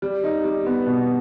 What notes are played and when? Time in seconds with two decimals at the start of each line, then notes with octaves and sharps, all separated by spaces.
0.02 G3
0.24 D#4
0.44 G3
0.66 B3
0.86 B2